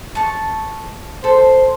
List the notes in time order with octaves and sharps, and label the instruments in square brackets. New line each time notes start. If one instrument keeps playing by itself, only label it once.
[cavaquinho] A5 C#6
[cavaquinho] A4 [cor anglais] C5